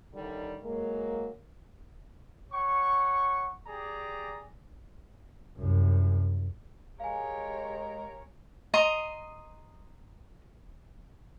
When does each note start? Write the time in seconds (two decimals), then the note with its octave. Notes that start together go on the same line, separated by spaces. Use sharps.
0.14 A2 D3 D#3 G3
0.63 F#3 G#3 A#3
2.52 C#5 F#5 C#6
3.67 G4 G#4 D5 A#5
5.57 C2 F#2
7.00 G#3 G4 A#4 C#5 F5 G#5
8.74 D#5 A#5 C6 D#6